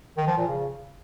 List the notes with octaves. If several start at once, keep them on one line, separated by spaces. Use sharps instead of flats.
D#3
F3
A#2
C#3